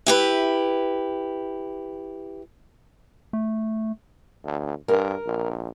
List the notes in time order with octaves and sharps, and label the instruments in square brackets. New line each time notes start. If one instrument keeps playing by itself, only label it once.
[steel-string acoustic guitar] E4 G4 B4
[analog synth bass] A3
[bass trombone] D2
[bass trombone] G2 [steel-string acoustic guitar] A#4
[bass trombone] A#1